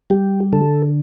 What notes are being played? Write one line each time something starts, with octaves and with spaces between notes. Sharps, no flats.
G3 G4
D3 A4